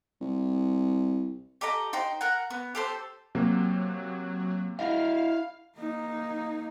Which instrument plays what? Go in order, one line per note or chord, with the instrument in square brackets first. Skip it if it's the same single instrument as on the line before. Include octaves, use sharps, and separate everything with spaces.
[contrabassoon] C2
[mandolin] G4 A4 D#5 A#5
D#4 C5 G5
A#4 F#5
B3
G4 A4 C5
[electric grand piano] C3 A#3 [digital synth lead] F#3
[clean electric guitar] E4 D#5 F#5 [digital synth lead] F5
[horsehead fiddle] A#3 D#4